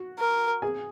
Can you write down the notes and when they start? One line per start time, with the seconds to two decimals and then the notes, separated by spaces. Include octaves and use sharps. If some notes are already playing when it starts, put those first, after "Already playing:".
Already playing: F#4
0.19 A#4
0.62 G#4 G#5